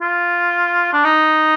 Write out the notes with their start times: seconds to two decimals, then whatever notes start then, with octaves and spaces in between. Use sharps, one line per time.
0.02 F4
0.93 D4
1.04 D#4